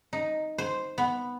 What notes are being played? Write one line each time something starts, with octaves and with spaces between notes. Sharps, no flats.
D#4
C5
B3